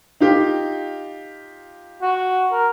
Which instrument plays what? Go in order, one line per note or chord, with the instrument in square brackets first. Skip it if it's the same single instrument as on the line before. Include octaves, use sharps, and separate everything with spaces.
[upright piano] D#4 F4 G4
[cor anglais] F#4
A#4